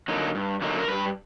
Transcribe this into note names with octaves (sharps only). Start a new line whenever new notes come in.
D3 F#3 A#3 D#4
G2
D3 F#3 A#3 D#4
A#4
G2 B4